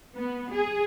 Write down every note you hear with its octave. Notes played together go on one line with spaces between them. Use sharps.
B3
G#4